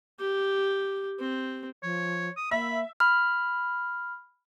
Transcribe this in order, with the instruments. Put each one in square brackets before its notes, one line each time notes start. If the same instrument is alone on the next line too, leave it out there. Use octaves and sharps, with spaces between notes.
[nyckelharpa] G4
C4
[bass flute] F3 [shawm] C#5
[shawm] D#6
[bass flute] A#3 [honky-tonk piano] E5 [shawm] B5
[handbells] B5 F6